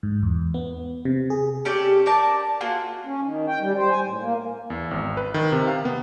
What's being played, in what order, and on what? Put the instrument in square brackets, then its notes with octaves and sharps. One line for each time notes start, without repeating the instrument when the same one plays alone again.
[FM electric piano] G#2
E2
B3
C3
G#4
[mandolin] C#4 G4 A4 D5
A#4 D5 A5
A#3 F4 F#4 G#4
[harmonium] C#4
D#3
G5
G3
C5
G#5
A2
A#3
[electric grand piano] E2
G#1
B4
D#3
C3
F5
B3